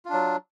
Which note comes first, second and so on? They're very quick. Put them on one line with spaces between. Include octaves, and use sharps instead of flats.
F4 D4 F#3